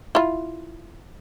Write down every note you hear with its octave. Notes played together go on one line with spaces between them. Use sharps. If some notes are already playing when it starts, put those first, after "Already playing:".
E4 F4